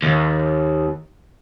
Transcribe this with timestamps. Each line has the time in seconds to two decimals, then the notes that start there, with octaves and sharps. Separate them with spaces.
0.02 D#2